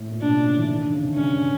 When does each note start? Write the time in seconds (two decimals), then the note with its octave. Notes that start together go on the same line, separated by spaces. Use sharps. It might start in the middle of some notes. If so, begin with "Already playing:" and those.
Already playing: A2
0.10 A#2
0.21 B2 D4
0.33 C#3
0.45 D3
0.57 E3
0.69 D#3
0.81 D3
0.93 C#3
1.04 C3
1.15 G2 C#4